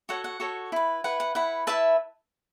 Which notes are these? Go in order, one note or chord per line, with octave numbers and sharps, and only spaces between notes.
F#4 A4 C#5 F#5
F#5
F#4 A4 C#5
E4 B4
E4 B4 F#5
F#5
E4 B4 F#5
E4 B4 E5 A5